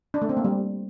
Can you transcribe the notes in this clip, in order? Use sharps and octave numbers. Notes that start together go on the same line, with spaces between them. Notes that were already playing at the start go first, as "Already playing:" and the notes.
D4
A3
C4
A#3
G3